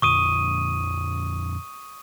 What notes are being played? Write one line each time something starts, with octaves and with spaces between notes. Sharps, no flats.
F2 A#2 D3 C#6 D#6 D#7